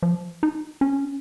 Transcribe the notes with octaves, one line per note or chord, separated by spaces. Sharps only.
F3
D#4
C#4